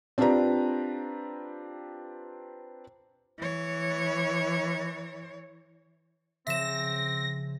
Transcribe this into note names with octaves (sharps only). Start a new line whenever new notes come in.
C4 D4 F4 G4 B4 A#5
E3 C#5
C#3 F3 C4 E5 A#6 E7